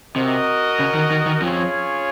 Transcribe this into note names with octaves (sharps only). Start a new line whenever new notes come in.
C3 F#4 A#4 D#5
C#3
D#3
D#3
D#3
F2 F3 C#4 F4 G#4 C#5